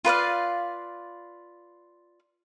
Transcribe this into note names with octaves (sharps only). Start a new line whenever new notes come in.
F4 B4 D5 F5